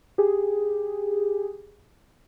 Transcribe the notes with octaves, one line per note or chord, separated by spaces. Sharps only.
G4 G#4